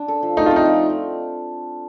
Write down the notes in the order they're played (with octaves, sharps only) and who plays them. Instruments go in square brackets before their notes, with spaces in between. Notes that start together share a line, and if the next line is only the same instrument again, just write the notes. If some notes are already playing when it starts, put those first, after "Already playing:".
Already playing: [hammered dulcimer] D4
A4
F3
[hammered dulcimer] A3 [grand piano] D#4
[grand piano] F4
[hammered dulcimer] C4 [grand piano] D#4
[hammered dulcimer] F3